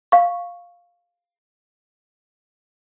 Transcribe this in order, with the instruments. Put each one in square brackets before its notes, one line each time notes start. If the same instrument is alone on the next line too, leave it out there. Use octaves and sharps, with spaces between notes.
[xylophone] F5 C#6